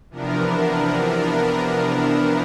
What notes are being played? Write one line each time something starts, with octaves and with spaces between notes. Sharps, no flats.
C3 E3 F3 B3 D4 A#4